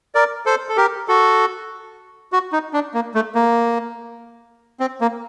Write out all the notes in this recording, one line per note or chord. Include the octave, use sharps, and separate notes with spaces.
A#4 D5
A4 C5
A4
G4 A#4
F#4 A4
F#4
D#4
D4
A#3
A3
A#3
C4
A#3